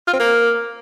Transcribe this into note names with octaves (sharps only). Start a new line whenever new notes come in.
F4
C4
A#3